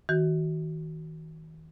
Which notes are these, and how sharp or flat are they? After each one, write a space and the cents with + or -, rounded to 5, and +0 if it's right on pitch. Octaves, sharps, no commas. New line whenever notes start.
D#3 +35 F#4 +10